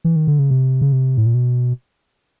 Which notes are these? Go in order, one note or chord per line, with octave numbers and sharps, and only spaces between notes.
E3
D#3
D3
C#3
C3
C#3
C3
A2
A#2
B2